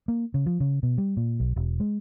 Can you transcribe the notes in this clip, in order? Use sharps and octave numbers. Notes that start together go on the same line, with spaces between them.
A#3
C#3
F3
C#3
B2
G3
A#2
B1
E1
G#3